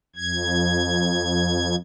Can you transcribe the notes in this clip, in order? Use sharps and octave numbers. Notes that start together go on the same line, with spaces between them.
F2 G#6